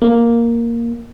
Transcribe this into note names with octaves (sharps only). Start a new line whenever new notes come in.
A#3